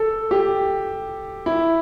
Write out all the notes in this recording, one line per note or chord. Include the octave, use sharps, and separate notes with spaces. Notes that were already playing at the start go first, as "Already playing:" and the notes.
Already playing: A4
G4
E4